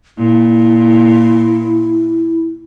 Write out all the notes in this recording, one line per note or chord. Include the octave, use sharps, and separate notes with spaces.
A#2 E4